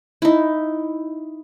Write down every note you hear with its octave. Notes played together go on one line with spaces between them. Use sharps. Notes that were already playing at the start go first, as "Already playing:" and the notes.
D#4 E4